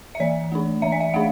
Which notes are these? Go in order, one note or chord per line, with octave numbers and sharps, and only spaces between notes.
E5
E3 D5
A3 D4
E3 E5
D5
E5
A3 D4 F5